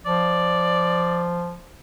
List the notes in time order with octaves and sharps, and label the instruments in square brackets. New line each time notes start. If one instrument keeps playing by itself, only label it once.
[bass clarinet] F3 [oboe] D5